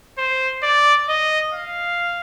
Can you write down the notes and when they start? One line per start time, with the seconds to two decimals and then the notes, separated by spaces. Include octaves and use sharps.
0.18 C5
0.63 D5
1.09 D#5
1.53 F5